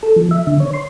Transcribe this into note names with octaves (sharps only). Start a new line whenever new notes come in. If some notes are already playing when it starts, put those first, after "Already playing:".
A4
F3
E5
D3
C#5
C6